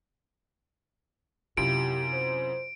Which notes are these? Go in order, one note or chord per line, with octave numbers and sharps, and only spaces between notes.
F#2 C3 E4 F4 G4 D7
C5